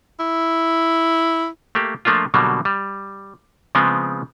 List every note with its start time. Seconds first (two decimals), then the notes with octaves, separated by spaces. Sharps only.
0.20 E4
1.75 A3 A#3 G4
2.05 F3 A3 A#3 D4 F4
2.34 B2 D3 F#3 G3 A#3
2.65 G3
3.75 C#3 F3 G#3 B3 C4